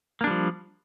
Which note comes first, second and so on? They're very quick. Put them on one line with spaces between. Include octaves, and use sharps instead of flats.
A#3 D4 G3 F3